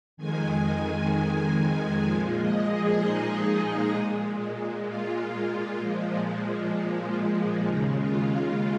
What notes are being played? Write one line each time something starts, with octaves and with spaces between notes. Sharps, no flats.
F2 D#3 G#3 G#5
A#2 F3 G#3 G#5
D#5
G#4
D#4
A#2 G#3
F4
A#2 F3 G#3
D#2 C#3 G#3 D#4
F4
F4